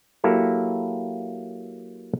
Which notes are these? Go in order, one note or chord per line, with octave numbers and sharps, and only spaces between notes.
F#3 A#3 E4 G4 A4